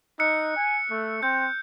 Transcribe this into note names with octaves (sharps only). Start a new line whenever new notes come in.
D#4 E6 F#6 C#7
G#5
A3
C4 G6